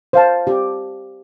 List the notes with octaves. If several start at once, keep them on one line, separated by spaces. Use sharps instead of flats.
C5 F5 A5
G4